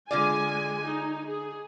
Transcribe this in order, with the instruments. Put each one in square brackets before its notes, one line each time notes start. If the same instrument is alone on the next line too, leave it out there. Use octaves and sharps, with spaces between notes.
[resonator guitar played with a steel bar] D3 F4 D5 [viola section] G#3 G#5
[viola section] D#4
G#4